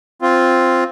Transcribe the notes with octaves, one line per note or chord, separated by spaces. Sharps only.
C4 F4